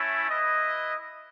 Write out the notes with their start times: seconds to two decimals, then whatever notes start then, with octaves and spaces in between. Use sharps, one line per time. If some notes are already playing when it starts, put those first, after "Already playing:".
Already playing: A3 C#4 E4
0.30 E4 B4 D#5